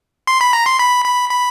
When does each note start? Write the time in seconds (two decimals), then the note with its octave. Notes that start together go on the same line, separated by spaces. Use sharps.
0.27 C6
0.41 B5
0.53 A#5
0.66 C6
0.79 B5
1.05 B5
1.30 B5